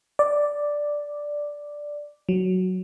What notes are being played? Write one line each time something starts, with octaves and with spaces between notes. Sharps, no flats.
D5
F#3